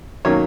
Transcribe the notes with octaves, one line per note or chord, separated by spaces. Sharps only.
D#3 F#3 A#3 C#4 C#5